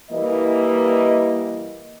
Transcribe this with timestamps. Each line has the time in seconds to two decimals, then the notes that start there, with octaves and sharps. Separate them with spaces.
0.10 E3 G3 A#3 D#5